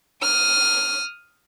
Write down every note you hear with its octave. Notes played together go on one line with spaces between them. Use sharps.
D#6 F6